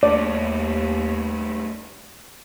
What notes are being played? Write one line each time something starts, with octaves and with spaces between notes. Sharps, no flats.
D#2 A2 G3 D5